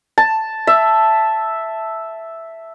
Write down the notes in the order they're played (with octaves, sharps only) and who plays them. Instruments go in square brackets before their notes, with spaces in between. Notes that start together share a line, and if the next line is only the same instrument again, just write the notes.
[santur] A5
E5